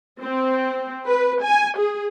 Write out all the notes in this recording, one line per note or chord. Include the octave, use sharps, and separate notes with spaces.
C4
B4
G#5
G#4